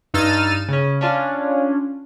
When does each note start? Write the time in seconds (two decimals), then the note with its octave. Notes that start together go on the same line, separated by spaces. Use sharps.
0.14 G2 D#4 E6 F6 A6 D#7
0.68 C#3 C#4
1.01 C#4 D4 F4